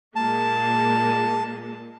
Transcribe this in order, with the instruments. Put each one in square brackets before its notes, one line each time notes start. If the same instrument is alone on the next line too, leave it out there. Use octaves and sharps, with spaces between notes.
[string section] A#2 G#3 A#3 [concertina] A5